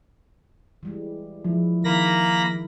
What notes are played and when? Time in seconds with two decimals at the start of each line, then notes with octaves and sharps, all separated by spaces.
0.83 E3 G3 G#3
1.45 F3 G#3 E4
1.84 D#3 A#3 E4 A#4 B5 A#6